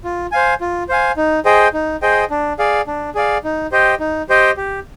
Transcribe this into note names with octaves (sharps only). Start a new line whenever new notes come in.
F4
C5 F5 G#5
F4
C5 F5 G#5
D#4
G#4 C5 D#5 G5
D#4
G#4 C5 D#5 G5
D4
G#4 D5 F5
D4
G#4 D5 F5
D#4
G4 C5 D#5 G5
D#4
G4 C5 D#5 G5
G4